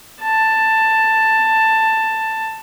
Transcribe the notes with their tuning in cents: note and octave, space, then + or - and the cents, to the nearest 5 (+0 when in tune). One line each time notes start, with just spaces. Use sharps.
A5 +10